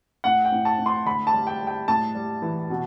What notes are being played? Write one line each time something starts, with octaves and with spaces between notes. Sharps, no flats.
A2 F#5
G5
A2
A5
A2
C6
D3 B5
A5
G3
G5
G3
G5
A2 A5
G3
E3
B2